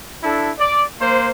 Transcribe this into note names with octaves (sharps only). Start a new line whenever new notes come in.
D4 E4 A4
D5
A#3 C5